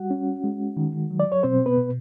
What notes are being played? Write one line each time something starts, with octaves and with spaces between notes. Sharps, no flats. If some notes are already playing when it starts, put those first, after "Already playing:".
Already playing: G3 F#4 F#5
C#4
G#3
D#3
F#3
D5
C#5
B2 C4 C5
B3 B4
B2